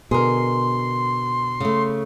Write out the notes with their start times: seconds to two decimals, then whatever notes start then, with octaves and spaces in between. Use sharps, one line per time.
0.11 B2 D3 G#4 A#4 C6
1.60 C#3 A3